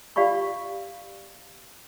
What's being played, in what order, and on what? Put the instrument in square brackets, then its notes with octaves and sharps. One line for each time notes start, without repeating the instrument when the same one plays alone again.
[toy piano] F4 G4 D5 F5 B5 C#6